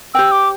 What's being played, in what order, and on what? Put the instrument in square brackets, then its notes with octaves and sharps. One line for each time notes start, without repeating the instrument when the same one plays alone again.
[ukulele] G4 C5 G5 [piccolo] E6
[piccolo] D6